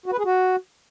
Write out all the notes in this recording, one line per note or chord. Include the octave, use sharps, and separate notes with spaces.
F#4
B4
G#4
F#4